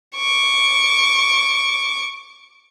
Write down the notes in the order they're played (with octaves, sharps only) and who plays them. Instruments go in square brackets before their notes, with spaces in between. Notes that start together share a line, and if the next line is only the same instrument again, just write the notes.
[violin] C#6 D6